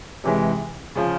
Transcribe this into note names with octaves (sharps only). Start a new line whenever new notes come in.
C3 E3 G#3
C#3 F3